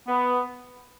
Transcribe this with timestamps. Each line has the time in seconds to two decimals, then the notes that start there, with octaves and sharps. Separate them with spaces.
0.07 B3